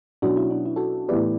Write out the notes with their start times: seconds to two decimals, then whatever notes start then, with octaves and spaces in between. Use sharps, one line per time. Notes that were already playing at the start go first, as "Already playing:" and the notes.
0.22 B2 F#3 C#4 D4 F#4
0.37 E4
0.51 D4
0.66 E4
0.76 F#4 A4
1.08 A2 E3 B3 E4 G4 B4 D5